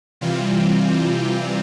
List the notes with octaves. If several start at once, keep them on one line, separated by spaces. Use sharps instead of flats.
C3 E3 G3 C4 F4